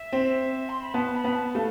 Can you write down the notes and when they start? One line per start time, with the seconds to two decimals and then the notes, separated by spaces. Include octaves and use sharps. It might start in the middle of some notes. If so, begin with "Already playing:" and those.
Already playing: E5
0.13 C4
0.69 C6
0.81 B5
0.94 B3 A5
1.14 B5
1.24 B3
1.34 A5
1.55 A3 F5